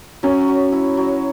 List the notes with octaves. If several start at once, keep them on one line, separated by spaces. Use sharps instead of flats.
F#3 C#4
F#3
E4
F#3